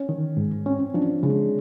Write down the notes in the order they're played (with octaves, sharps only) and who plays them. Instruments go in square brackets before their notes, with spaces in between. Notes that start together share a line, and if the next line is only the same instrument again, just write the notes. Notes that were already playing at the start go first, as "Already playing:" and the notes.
Already playing: [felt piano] C#4
[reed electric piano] D#3
G#2
[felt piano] C4 [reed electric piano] C#4
[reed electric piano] F3 [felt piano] D4
[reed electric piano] C#3 [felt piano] G#3